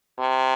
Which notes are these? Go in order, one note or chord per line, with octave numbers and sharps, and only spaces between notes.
C3